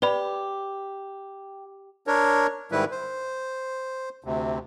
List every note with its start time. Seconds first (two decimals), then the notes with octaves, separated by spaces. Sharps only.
0.02 G4 B4 D5 B5
2.07 D4 A#4 C#5
2.72 G#2 D#3 G3 E4 B4
2.92 C5
4.24 D2 C3